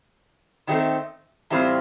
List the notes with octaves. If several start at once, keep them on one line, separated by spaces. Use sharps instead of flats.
D#3 F#3 A3 C4
A2 E3 G3 C4 F4